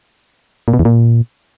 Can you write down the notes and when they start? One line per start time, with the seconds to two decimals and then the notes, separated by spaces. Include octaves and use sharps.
0.68 A#2
0.74 B2
0.79 E2
0.85 A#2